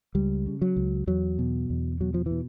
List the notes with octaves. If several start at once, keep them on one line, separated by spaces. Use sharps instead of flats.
C#2 G3
C#3
F#3
C#2
E2 F#3
B2
E2
B2 F#3
F3
B2 E3